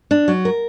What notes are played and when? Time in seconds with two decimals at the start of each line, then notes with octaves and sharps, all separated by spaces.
0.11 D4
0.28 F#3
0.45 A#4